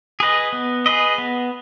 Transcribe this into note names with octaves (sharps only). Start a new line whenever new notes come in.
G#4 B4 D#5
B3
G#4 B4 D#5
B3